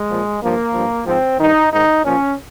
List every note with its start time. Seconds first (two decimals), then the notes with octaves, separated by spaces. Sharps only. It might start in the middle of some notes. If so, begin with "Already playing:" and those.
Already playing: G#3
0.09 A#2 F3
0.42 G2 F3 A#3
0.73 G2 F3
1.06 G#2 F3 C4
1.38 G2 D#3 D#4
1.71 G#2 D#3 D#4
2.04 A#2 F3 C#4